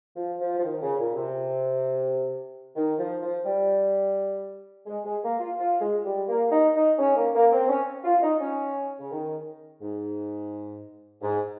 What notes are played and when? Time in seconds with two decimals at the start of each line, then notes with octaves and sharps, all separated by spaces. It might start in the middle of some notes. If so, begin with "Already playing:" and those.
0.16 F3
0.40 F3
0.59 F3
0.64 D#3
0.82 C#3
0.99 A#2
1.16 C3
2.76 D#3
2.99 F3
3.22 F3
3.46 G3
4.86 G#3
5.04 G#3
5.23 A#3
5.40 F4
5.58 F4
5.81 G#3
6.04 G3
6.29 A#3
6.51 D#4
6.75 D#4
6.99 C#4
7.16 A#3
7.34 A#3
7.52 C4
7.69 C#4
8.04 F4
8.22 D#4
8.40 C#4
8.99 C#3
9.11 D#3
9.81 G#2
11.22 G#2